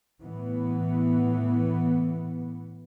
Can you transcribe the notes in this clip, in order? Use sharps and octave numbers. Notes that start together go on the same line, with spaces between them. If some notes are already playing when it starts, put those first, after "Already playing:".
A2 E3 B3